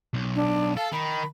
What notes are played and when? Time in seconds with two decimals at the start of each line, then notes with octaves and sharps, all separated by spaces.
0.14 B1
0.36 D4
0.77 A4 F5 A5
0.93 D#3 B5